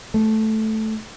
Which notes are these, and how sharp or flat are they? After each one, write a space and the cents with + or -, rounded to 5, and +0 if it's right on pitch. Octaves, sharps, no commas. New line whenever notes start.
A3 -5